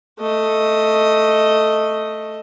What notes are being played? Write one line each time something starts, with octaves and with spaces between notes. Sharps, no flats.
A3 D#5